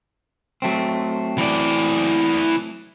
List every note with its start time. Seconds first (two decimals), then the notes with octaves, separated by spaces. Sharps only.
0.62 F#3 A3 C4
1.38 E3 D5